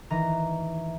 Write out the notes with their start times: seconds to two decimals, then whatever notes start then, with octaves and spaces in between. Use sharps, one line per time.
0.10 D#3 E3 A#5